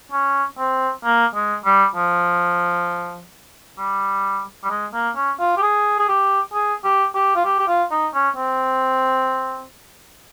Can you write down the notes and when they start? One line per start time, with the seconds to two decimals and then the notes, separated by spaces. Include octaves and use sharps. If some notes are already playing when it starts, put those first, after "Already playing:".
0.12 C#4
0.58 C4
1.05 A#3
1.35 G#3
1.65 G3
1.96 F3
3.78 G3
4.64 G3
4.70 G#3
4.94 A#3
5.16 C#4
5.39 F4
5.57 G4
5.62 G#4
5.99 G#4
6.08 G4
6.53 G#4
6.84 G4
7.15 G4
7.36 F4
7.45 G4
7.59 G4
7.68 F4
7.91 D#4
8.14 C#4
8.37 C4